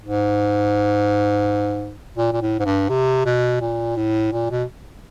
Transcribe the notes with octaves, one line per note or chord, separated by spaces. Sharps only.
G#2
A#2
A#2
A2
G#2
G2
C3
B2
A#2
A2
A#2
B2